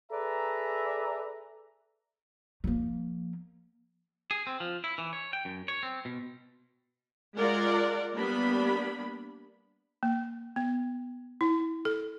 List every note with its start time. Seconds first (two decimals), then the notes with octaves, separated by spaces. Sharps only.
0.12 G#4 A4 B4 D5 E5 A#5
2.64 F3 A#3
4.31 G#4
4.47 C4
4.60 F3
4.84 E4
4.98 E3
5.13 C#5
5.33 G5
5.45 F#2
5.68 C#5
5.83 C4
6.05 B2
7.36 G#3 F4 A#4 D5 F#5
8.14 G3 A#3 B3 D4 B5
10.03 A#3
10.56 B3
11.41 E4
11.85 A4